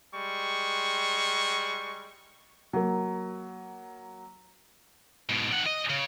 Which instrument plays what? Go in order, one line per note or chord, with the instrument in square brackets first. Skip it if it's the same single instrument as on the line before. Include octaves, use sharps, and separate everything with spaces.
[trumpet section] G3 G#3 C#6
[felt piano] F#3 A#3
[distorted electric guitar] G#2 B2
D#3 F#5
D#5
C#3